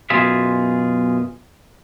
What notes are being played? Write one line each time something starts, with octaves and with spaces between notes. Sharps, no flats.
F#2 B2 F4 G#4 E5